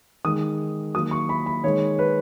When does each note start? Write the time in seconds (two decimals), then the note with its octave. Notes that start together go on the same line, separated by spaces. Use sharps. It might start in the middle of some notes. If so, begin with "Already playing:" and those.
0.25 D#3 G#3 D#6
0.95 D#3 F#3 A#3 D#6
1.11 C#6
1.29 B5
1.46 B5
1.64 D#3 G#3 C#5
1.99 B4